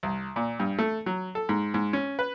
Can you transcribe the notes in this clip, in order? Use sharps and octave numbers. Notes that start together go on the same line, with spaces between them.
C2
A#2
G2
A3
F#3
A4
G#2
G#2
C#4
B4